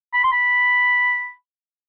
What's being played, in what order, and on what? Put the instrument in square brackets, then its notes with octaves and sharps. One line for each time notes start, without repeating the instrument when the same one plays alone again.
[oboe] B5
C6
B5